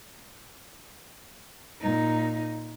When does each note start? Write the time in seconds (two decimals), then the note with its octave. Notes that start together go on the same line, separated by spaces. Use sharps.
1.80 A#2 D#4